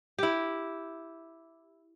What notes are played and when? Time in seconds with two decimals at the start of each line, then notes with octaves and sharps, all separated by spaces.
0.19 E4 G4